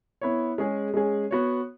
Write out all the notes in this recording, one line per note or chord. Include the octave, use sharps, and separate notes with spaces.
B3 E4 C#5
G#3 C#4 G#4
G#3 C#4 G#4
B3 F#4 C#5